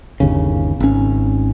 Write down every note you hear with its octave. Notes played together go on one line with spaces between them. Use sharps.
G1 D#2 C#3
G#1 C#4